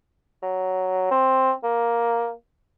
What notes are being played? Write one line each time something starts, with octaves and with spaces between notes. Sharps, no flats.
F#3
C4
A#3